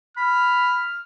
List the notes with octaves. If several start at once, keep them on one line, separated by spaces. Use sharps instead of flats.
B5 F6